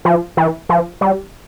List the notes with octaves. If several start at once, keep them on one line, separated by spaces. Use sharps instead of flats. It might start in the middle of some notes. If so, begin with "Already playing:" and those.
F3
E3
F3
G3